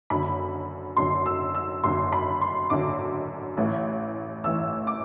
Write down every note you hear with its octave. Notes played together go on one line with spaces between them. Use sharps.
F#1 F#2 D3 B5
F#1 F#2 D3 C6
E6
E6
F#1 F#2 D3 C6
B5
C6
F#1 F#2 D3 D6
A1 A2 E3
A1 A2 E3 E6
D6